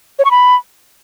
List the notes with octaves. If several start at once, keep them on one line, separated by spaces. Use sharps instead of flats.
C#5
C#6
B5